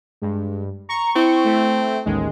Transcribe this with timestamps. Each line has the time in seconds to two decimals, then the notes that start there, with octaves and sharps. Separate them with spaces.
0.22 G2 G#3
0.89 A#5 C#6
1.16 C4 E4
1.45 A3
2.05 A1 D#2 G#3